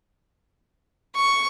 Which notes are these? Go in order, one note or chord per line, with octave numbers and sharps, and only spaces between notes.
C#6